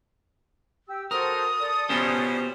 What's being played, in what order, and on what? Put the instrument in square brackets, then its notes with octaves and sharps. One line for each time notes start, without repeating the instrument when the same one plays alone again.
[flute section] G4 E6
[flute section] F#4 A4 C5 [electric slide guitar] A#4 [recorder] D#6
[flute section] A4 D5
[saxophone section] B2 F3 C#4 [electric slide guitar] B3 G4 C5